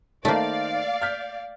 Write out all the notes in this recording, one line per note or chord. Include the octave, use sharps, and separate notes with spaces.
D#3 A3 A#3 C5 D5 F5
F6 G6 B6